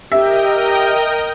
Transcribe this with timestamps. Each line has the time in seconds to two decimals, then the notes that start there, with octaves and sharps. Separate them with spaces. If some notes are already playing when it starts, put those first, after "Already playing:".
0.12 G4 A#4 D#5 E5 G5